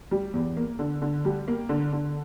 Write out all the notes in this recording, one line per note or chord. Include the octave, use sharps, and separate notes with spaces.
G3
E2
A#3
D3
D3
G3
A#3
D3
D3